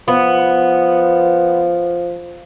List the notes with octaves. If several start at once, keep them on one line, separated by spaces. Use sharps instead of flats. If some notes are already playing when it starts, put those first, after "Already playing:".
F3 B3